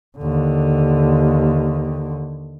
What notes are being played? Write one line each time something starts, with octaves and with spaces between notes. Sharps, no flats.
D#2 D3